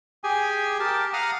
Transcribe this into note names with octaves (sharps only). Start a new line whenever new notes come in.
G4 G#4 G#5
G4 A#4 A5
F5 F#5 A#5 D#6 F6